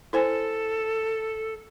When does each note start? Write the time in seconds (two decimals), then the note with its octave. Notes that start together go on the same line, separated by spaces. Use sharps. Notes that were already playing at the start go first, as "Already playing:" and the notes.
0.13 E4 A4 C5 G#5